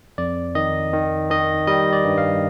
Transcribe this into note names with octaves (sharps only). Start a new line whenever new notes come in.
F2 D5
D#3 D#5
D#3
D#3 D#5
G3 D#5
D5
G2
F5